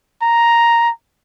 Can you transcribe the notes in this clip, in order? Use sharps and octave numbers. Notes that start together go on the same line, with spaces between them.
A#5